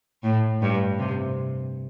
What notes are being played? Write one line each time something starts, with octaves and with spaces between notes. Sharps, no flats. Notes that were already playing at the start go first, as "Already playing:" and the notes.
A2
G2
C3